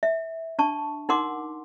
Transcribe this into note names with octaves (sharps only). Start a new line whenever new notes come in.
E5
D4 A5 C#6
D#4 A#4 F#5 C6 D6